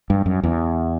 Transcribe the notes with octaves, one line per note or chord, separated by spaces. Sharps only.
G2
F#2
E2